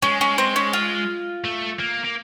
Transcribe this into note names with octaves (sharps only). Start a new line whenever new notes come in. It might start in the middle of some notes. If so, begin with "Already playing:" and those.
G#3 C#4
C#4
C4
C#4
F4
A3
A#3
A#3